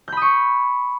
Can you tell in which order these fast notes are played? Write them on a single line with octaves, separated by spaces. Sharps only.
G6 B5 D#6 C#6